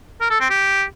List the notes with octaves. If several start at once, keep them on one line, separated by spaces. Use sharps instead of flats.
A#4
A4
C4
G4